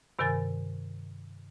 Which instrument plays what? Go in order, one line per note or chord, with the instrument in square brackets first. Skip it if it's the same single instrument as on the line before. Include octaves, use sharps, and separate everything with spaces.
[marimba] G2 C3 D#3 A#4 G#5 A6